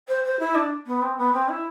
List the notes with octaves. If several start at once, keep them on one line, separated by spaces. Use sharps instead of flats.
C5
C5
E4
D4
B3
C4
B3
C4
E4